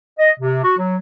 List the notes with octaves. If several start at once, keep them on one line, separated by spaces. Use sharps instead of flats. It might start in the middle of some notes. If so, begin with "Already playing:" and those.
D#5
C3
F#4
F#3